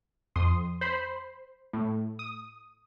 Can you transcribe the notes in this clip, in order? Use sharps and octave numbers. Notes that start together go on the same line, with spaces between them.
F2 C6 D#6
C5 B5 C7
A2
D#6